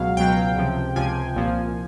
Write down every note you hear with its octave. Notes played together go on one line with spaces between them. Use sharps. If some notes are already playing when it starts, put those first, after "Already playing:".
Already playing: C#2 B2 F#3 F5
C#2 B2 F#3 G5
C#2 C3 F3
C#2 C3 F3 G#5
C2 A#2 F3